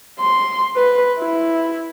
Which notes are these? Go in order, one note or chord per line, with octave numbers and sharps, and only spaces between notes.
C6
B4
E4